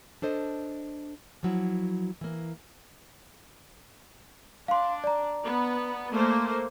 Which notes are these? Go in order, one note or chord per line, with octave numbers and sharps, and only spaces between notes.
D4 A4 C5 D#5
F3 F#3 E4
E3 A#3
D4 F5 C6
D5 A#5
B3
A3 A#3 C5